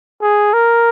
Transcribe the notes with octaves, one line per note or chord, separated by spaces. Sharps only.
G#4
A#4